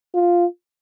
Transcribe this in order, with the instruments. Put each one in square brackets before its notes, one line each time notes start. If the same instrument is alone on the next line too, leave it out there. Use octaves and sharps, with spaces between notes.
[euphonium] F4